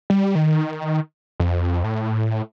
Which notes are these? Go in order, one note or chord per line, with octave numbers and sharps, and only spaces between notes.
G3
D#3
F2
A2